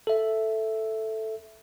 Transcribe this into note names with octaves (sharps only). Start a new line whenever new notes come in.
A4 E5